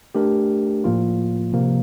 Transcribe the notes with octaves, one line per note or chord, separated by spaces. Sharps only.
A3 D4 G4 A#4
A2 F3 A#3 F4
C3 F3 A#3